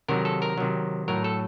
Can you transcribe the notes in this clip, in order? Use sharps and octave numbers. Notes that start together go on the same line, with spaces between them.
C3 D#3 F#3 A#4
A4
A#4
C3 D#3 F#3
A2 F#3 A#4
A4